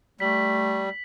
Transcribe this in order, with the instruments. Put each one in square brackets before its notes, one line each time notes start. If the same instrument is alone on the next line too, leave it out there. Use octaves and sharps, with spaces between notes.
[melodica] G3 [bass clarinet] A3 [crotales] B6 F#7